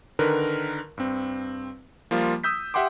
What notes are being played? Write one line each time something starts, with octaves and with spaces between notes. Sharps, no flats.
D3 D#3 A#4 B4
G2 C4
F3 G3 A#3 F4
D#6 E6 G6 B6
G4 E5 F#5 G5 C6 D6